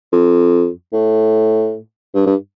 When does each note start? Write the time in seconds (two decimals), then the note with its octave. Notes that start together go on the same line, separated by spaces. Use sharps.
0.12 F2
0.93 A2
2.14 G2
2.26 G2